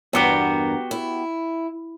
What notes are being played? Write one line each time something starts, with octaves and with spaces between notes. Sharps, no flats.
E2 G2 B3 F#4 G4 A#4
E4